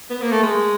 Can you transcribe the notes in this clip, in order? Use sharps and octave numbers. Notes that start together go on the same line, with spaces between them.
B3
A#3
A3
G#3